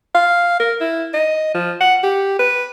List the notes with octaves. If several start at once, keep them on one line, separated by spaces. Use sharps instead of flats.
F5
A#4
E4
D#5
F3
F#5
G4
B4